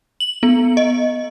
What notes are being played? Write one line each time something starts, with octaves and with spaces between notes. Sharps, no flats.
F#7
B3
D#5